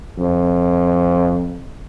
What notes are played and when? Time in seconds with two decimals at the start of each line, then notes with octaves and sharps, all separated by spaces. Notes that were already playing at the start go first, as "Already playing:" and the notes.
0.18 F2